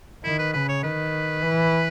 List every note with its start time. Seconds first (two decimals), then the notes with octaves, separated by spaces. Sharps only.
0.24 D#3 E4
0.39 B4
0.53 C#3 B4
0.69 C#5
0.83 D#3 B4
1.43 E3